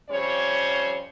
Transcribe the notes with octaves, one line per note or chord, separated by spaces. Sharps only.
F2 G3 C#4 C5 C#5